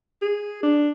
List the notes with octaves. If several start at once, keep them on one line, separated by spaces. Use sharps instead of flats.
G#4
D4